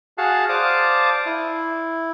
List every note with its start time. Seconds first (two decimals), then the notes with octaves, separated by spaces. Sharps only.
0.18 F#4 G#4 F5 F#5 A5
0.49 C5 D5 F5 A5 D6 D#6
1.26 E4